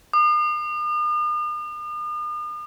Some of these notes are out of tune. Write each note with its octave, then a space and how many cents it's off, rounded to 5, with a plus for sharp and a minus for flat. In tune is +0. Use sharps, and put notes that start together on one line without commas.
D#6 -45